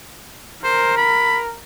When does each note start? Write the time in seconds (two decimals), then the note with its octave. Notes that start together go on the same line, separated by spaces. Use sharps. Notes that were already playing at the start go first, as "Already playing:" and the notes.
0.64 A#4 C5
0.97 B5